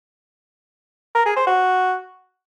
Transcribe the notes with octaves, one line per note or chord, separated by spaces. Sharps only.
A#4
G#4
C5
F#4